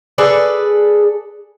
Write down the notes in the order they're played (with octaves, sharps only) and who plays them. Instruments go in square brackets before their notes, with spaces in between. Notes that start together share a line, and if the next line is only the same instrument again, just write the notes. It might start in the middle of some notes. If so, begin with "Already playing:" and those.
[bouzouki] G#4 A4 B4 D5